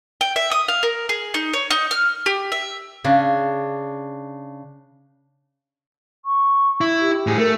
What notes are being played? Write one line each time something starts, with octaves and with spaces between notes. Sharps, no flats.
G5
E5
D#6
F5
A#4
G#4
D#4
C#5
D#4
F6
G4
E5
C#3 D4
C#6
E4
G4
A2 G#4
A3 A#4